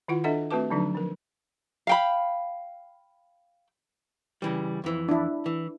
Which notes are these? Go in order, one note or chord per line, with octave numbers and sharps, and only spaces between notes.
D#3 E4 F4 F#5
D4 A4 D#5 E5 F#5
A3 C4 F#4 B4 A5 D6
D3 F3 F#3 D4 D#4
F3 A#4
F5 G5 B5
C#3 E3 G3
F2 E3
D4 E4
E3